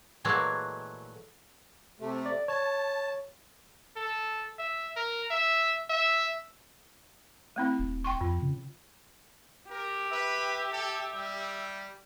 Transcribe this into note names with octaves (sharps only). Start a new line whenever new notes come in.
A#2 E3 F#3 G#3 A3
C3 A3
D5
C#5 A5
A4
E5
A#4
E5
E5
A3 C4 E4
D#1
G5 C6 C#6
F2 F4
C#3
G4 A#4
B4 E5
A4
G3